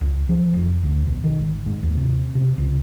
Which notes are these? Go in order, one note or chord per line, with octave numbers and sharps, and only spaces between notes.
C#2
F3
F1
D2
B1
D#3
G#1
G#2
D#2
C3
C3
C#2